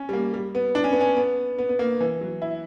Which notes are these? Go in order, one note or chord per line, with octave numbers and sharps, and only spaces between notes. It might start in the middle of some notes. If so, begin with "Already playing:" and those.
Already playing: C#4
G3
A#3
G3
B3
D4
C#4
B3
C#4
B3
B3
B3
A#3
E3
F#3
E4